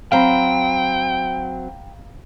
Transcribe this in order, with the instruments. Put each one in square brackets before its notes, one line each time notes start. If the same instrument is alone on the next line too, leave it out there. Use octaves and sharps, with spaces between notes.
[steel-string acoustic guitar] F#3 C4 [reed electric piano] F5 A#5 B5 [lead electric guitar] G5